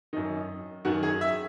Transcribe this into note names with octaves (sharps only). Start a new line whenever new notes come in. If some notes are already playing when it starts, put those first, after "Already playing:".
F#2 D#3 D#4
F#2 D#3 F#4
G#4
E5